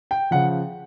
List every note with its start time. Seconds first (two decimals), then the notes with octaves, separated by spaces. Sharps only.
0.11 G5
0.31 C#3 F3 F#5